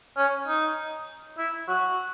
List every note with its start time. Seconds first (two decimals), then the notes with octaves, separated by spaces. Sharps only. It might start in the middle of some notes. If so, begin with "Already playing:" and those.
0.17 C#4
0.48 D#4
1.38 E4
1.68 F#4